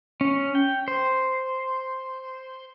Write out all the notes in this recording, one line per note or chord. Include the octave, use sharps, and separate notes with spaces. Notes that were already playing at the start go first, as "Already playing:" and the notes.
C#4
G5
C5